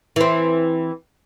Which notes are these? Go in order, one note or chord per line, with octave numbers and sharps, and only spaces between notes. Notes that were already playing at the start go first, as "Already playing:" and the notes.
E3 C4